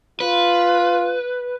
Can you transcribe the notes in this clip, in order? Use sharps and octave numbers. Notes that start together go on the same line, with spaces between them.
F4 B4